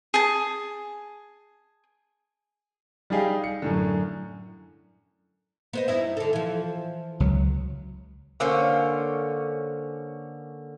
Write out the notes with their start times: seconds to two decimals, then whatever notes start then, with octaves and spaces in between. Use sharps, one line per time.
0.14 G#4 A5
3.10 G3 D#4 G4 G#4 D#5 F5
3.44 C#7
3.62 F#2 A2 D3
5.73 B3 C5 D#5
5.88 G2 D#4 E4
6.17 D3 A4
6.33 E3 F3
7.20 C#2 F#3
8.40 D3 A#3 C#4 C5